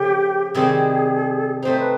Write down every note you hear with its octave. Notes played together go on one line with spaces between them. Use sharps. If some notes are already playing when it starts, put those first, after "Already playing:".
Already playing: C#3 F3 A3 C#4 G4
C3 D#3 G3 C4 G#4
A3 C4 D#4 C5
B4